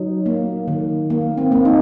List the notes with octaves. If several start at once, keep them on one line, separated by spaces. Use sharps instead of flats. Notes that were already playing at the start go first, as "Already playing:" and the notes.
Already playing: F#3 D#4
A#3
D#3
A#3
C4
A#3
D#4